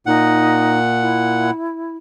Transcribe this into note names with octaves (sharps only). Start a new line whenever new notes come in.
A#2 D#4 F#5
E4